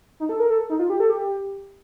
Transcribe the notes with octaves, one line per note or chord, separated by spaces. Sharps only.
D#4
A4
A#4
A4
D#4
F4
G4
A4
G4